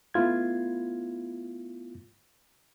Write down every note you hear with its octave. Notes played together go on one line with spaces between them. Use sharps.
A3 B3 E4 F4 G#6